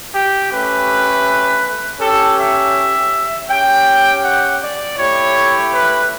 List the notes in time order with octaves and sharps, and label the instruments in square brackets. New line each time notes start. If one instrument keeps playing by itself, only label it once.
[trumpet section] G4
A3 C#4 G4 B4
C#4 G4 A4
E5
C#4 G4 G5
F#5
D5
A3 E4 G4 C#5
B4